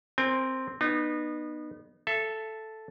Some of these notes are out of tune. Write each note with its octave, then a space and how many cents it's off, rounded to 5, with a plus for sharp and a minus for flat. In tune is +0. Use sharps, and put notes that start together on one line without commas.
C4 +0 A#4 +0 G5 +45
B3 -15 D#4 -35
A4 -5 E5 +25